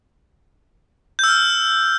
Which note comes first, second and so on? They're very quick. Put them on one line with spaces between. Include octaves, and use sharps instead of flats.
G6 E6 F6